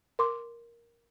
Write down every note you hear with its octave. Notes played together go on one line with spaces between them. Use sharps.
A#4 C6 D6